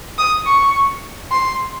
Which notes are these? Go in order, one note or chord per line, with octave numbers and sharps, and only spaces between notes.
D#6
C#6
C6